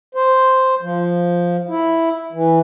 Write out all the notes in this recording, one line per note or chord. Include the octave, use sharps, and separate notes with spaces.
C5
F3
E4
E3